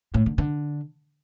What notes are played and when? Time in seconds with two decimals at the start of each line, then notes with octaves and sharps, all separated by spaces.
0.14 A2
0.26 D3
0.38 D3